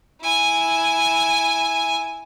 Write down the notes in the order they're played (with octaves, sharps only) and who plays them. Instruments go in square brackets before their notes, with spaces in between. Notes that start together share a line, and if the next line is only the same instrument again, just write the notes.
[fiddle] E4 G#5